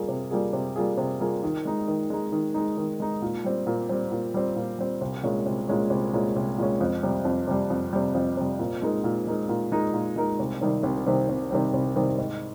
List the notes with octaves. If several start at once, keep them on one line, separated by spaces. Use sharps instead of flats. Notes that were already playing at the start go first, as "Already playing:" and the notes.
Already playing: G3 A#3 F4 G#4
C3
G3 A#3 F4 G#4
C3
G3 A#3 F4 G#4
C3
G3 A#3 F4 G#4
D#3
G#3 D#4
D#3
G#3 D#4
D#3
G#3 D#4
D#3
G#3 D#4
A#2
G3 C4
A#2
G3 C4
A#2
G3 C4
A#2
G3 C4
C2
A#2 G#3 C#4
C2
A#2 G#3 C#4
C2
A#2 G#3 C#4
C2
A#2 G#3 C#4
F2
C3 G3
F2
C3 G3
F2
C3 G3
F2
C3 G3
A#2
G#3 D#4 A#4
A#2
G#3 D#4 A#4
A#2
G#3 D#4 A#4
A#2
G#3 D#4 A#4
C2
C3 D#3 G3 C4
C2
C3 D#3 G3 C4
C2
C3 D#3 G3 C4
C2
C3 D#3 G3 C4
G#2